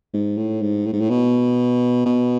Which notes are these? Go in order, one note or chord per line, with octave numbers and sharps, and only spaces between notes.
G#2
A2
G#2
A2
G#2
A2
B2
B2